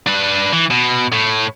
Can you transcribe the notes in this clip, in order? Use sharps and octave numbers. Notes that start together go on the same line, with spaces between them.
D4 B4
E3
B2
A2